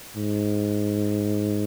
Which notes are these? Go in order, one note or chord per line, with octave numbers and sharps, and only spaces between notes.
G#2